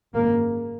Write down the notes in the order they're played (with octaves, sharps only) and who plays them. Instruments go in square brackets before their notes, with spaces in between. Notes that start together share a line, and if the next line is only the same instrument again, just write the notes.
[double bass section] G#1 F#2 C#3 A#3